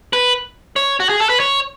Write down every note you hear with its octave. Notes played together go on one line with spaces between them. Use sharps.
B4
C#5
F#4
G#4
A4
B4
C#5